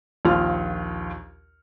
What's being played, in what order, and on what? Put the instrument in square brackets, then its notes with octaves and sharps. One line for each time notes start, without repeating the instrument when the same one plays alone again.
[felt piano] A#1 D#2 F3 F4 F6